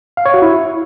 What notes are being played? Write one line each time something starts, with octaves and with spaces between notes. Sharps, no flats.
F5
C#5
F#4
E4